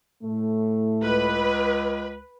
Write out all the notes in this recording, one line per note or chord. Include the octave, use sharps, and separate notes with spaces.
A2 A3
C#2 B4